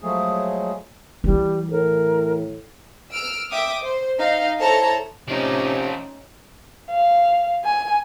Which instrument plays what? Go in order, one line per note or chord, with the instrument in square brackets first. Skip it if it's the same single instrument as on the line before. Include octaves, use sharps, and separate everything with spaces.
[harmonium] F3 F#3 G#3 A3 G#4
[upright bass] E3 E4 [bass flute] G3
[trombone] A2 [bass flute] A#4
[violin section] E6 F6 D7
E5 G5 D6 D#6
C5
D#4 F5
E4 A4 C5 C#5 A5 A#5
[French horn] C3 [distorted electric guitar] F3 D5 [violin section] A3 C#4 D#4
[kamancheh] F5
G#5